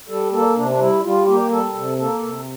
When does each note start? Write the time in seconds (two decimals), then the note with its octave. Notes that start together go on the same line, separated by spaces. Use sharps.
0.08 G3 A4
0.32 A#3 A4
0.56 C3 D4
0.71 D4
0.79 G3 E4
1.03 G3 F4
1.26 A#3 G4
1.50 G3 A4
1.74 C3
1.98 A#3 A4
2.22 C3